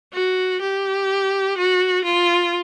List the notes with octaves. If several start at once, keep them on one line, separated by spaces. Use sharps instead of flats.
F#4
G4
F#4
F4